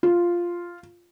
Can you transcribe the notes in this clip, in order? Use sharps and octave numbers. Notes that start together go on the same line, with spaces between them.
F4